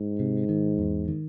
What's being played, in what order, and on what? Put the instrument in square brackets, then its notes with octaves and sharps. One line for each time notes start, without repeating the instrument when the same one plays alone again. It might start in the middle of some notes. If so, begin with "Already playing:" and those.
Already playing: [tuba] G#2
[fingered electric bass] C3
D#3
E2
D#3